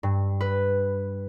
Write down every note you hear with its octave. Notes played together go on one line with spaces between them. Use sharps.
G2
B4